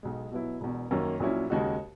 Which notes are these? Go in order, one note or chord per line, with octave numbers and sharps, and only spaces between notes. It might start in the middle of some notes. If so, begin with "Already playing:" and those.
B1 B2 G#3
B2 F#3 B3 E4
E1 E2 B2
F#2 D#3 F#3 A#3 C#4
A#1 A#2 F#3 C#4 E4
D#2 C#3 G#3 D#4 F#4